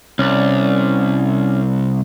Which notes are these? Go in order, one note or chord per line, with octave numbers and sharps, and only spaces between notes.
C2 C#4 D5